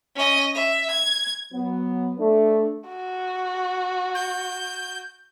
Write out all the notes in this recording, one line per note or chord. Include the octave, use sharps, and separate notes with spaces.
C#4 D#5
E5
G#6
F#3 B3
A3 D4
F#4
G6